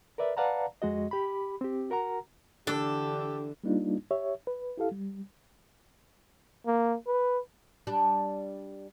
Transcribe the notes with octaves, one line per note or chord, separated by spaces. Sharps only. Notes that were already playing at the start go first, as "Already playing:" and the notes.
A#4 B4 D5 E5
B4 D5 F5 F#5 A5 A#5
F2 G#3 F#4 D#5
G4 B5
C4 G4
F#4 A#4 F#5 A#5
D3 E3 D4 G4 A4
G3 A#3 D4 D#4 F4
G4 C#5 E5
B4
E4 G4 A4 F5
G3
A#3
B4
G3 D4